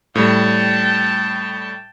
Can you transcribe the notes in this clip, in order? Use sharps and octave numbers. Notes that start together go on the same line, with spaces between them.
A2 G3 G5 A5